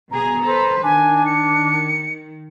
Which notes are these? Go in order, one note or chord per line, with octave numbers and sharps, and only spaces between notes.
B2 G#4 A#5
A4 B4 C5
D#3 D4 G#5
C#7